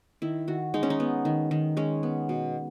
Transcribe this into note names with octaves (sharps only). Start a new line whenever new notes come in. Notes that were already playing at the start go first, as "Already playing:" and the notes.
D#3 E4
D#3 F#4
G#3 D#4
C#4
D#4
B3
D#3
D#3
G#3 C#4
B3
B2